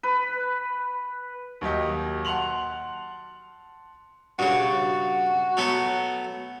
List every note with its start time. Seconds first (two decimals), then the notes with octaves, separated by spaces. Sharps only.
0.03 B4
1.61 D#2 F#3 G4 D#5
2.25 F#5 A5 C6 F7 F#7
4.39 G2 C#3 F#4
5.57 F#3 A3 B3